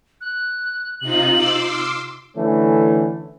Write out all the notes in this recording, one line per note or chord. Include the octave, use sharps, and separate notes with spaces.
F#6
C3 D#4 F4 F#7
C6 D6 E6
F6
D3 E3 A3 C#4